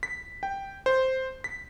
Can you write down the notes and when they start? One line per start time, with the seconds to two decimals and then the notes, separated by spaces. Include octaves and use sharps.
0.03 B6
0.43 G5
0.86 C5
1.44 B6